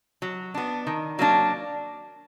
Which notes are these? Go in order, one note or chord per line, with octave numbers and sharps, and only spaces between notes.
F#3
B3 D4
D#3
F#3 A#3 D4